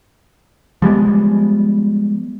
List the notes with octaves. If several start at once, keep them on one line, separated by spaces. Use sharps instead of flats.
F3 G3 G#3 B3